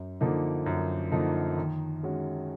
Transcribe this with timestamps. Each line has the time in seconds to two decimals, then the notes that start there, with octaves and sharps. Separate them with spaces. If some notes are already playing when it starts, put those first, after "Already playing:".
Already playing: F#2
0.21 D3 F3 A#3 D#4
0.66 F#2
1.12 D3 F3 A#3 D#4
1.57 D#3
2.03 G#3 C#4 F#4